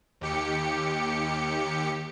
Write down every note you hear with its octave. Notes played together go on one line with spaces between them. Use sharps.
D#2 G4 C#7